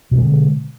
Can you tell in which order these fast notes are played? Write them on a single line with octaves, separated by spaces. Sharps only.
B2 C4 G#3 D3